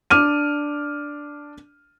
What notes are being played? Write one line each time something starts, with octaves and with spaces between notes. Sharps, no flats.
D4 D6 F6 D#7